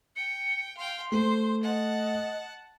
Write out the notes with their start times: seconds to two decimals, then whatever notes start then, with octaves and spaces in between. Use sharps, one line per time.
0.16 G5 C#7
0.77 F5 G5 C6
1.12 A3 C5
1.63 D#5 F#5 A5